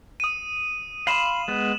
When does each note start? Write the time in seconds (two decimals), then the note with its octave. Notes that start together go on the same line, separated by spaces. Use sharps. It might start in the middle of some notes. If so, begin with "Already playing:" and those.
0.20 D#6 D#7
1.07 F5 B5 C6 E7 F#7
1.48 G#3 B3